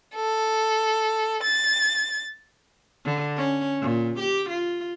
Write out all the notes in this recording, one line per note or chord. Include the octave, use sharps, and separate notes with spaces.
A4
A6
D3
C#4
A#2
G4
F4